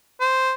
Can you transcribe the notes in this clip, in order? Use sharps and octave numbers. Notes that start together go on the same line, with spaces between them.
C5